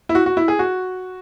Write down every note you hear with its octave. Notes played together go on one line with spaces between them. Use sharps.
E4
F#4
F#4
E4
G#4
F#4